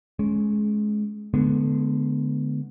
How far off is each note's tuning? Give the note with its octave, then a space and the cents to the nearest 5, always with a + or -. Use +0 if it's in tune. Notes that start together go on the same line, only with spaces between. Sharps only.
G#3 +25 C#4 +0
D3 +0 G#3 +35 B3 +0